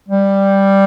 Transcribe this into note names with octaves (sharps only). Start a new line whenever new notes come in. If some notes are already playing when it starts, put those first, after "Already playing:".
G3